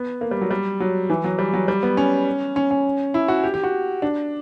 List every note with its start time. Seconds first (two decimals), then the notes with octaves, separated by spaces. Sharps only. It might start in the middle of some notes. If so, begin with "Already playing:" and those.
Already playing: B3
0.21 A#3
0.31 G3
0.41 F#3
0.51 G3
0.80 F#3
1.10 E3
1.24 F#3
1.39 G3
1.54 F#3
1.68 G3
1.83 B3
1.97 C#4
2.56 C#4
2.71 C#4
3.14 E4
3.28 F#4
3.43 G4
3.54 G4
3.64 F#4
4.02 D4